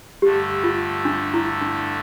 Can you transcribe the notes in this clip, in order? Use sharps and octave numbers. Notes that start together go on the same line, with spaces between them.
G2 D3 A3 G4
F4
D4
E4
D4